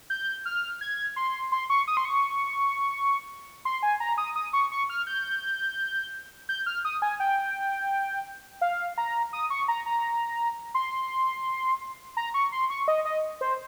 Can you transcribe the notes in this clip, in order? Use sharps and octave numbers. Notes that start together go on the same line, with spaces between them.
G6
F6
G#6
C6
C6
C#6
D#6
C6
C#6
C6
G#5
A#5
D#6
D#6
C#6
C#6
F6
G6
G6
F6
D#6
G#5
G5
F5
A#5
D#6
C#6
A#5
A#5
C6
A#5
C#6
C6
C#6
D#5
D#5
C5